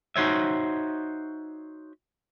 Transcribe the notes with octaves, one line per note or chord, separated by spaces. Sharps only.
D#4 F#4 C5 C#5 E5